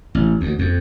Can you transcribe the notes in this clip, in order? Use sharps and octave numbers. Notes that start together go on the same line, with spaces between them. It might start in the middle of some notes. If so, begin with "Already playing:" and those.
A1
D2
F2